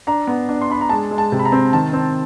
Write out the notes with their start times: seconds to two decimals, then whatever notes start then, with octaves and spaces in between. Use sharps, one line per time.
0.07 D4 A#5
0.27 B3
0.49 D4
0.61 C6
0.70 D4 B5
0.81 A#5
0.89 G#3 A5
1.11 G#3
1.18 A5
1.32 C3
1.39 B5
1.45 A#5
1.52 C4
1.73 D#3 A5
1.93 C4